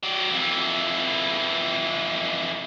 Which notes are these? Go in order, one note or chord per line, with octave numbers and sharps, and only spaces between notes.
F#3 D5
F2 E3